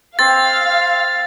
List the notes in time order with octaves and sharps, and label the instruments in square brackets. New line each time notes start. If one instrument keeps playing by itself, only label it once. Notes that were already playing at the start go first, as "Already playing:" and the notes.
[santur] C4 C5 [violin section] F5 [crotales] A6